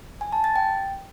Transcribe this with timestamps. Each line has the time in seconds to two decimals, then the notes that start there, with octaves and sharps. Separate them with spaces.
0.21 G#5
0.32 A5
0.44 A6
0.56 G5